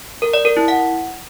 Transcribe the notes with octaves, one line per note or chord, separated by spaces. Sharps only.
A#4
D5
A#4
E4
F#5